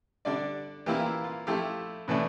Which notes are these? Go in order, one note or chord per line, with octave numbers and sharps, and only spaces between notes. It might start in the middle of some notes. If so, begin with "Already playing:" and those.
D3 G3 D4 D5
E3 A#3 E4 G4
F4
F4
F3 A3 E4 G4
A2 E3 A3 D4